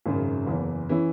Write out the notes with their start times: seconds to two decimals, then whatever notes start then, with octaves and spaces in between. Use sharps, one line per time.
0.06 G#1 F#2 C#3
0.46 F#1 E2 E3
0.89 E3 C#4 E4